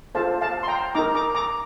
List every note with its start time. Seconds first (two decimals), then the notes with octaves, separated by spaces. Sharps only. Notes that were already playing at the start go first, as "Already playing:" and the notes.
0.15 F4 A4 C5 F5 A5
0.41 F5 A5
0.63 C6
0.68 G5 A#5
0.95 D#4 A#4 A#5 D6
1.15 A#5 D6
1.35 A#5 D6